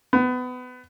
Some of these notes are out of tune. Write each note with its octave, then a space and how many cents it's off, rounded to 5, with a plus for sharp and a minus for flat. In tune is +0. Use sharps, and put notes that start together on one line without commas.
B3 +25